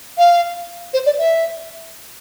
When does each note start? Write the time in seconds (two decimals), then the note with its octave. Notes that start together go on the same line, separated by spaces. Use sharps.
0.18 F5
0.93 C5
1.06 D5
1.18 E5